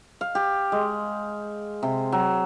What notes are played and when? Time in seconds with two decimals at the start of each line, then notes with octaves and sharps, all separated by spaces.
0.21 F5
0.35 G4
0.72 G#3
1.83 C3
2.12 F#3